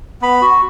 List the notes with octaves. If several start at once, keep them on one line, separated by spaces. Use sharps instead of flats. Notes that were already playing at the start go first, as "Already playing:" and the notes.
B3 B5
F#4